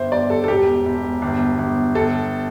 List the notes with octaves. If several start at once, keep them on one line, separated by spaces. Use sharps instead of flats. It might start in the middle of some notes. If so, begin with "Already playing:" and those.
Already playing: G1 C5 E5
G1 D5
A4
A4
E1 G4
E1
G1
G1
G1 A4